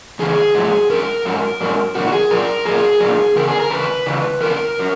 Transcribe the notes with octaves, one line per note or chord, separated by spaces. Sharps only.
E2 C#3 E3 G#4
G#2 F#3
G#2 F#3 A#4
G#2 F#3
G#2 F#3
A#2 F#3 F#4
F#4
G#4
A#2 F#3 A#4
A#2 F#3 G#4
A#2 F#3
E2 C#3 A#4
G#4
A#4
E2 C#3 B4
E2 C#3 E3
E2 C#3 E3 A#4
F#3